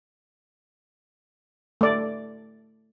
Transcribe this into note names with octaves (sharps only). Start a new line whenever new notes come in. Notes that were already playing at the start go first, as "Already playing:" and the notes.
A3 D5